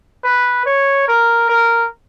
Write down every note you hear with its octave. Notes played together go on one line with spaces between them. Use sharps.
B4
C#5
A#4
A#4